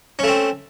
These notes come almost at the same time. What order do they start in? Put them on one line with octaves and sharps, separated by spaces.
C#4 A3 C4